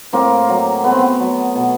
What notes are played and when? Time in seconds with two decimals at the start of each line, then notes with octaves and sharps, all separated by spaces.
0.13 A2 A#3 C4
0.49 F#3
0.84 A3 B3
0.91 C4
0.99 B3
1.20 F#3
1.55 B2